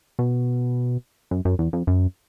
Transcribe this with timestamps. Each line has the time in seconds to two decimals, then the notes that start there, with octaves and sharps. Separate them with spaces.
0.19 B2
1.31 F#2
1.45 F#2
1.59 E2
1.73 F2
1.87 F#2